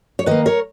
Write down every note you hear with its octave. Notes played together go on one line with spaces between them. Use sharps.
C#5
D#3 A#3 B4 D#5
A#4 C#5